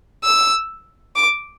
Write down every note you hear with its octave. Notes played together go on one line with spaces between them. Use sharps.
E6
D6